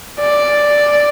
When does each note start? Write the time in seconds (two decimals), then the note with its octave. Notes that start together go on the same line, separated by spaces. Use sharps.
0.20 D5